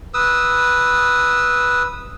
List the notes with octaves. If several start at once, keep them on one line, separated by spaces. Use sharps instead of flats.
B4 D#6 E6